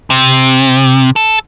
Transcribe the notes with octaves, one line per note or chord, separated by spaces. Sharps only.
C3
A4